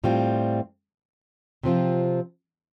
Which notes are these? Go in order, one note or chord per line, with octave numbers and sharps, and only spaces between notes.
A2 G3 C4 F4
C3 F3 C4 F4